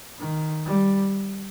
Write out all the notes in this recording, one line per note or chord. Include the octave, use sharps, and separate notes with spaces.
D#3
G3